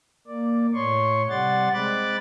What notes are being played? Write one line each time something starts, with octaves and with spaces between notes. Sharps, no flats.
A#3 D5
A2 C#5 C6 C#6
C3 G3 D5 F#5 C6 A6
G#3 C4 B5 D6 F#6 A6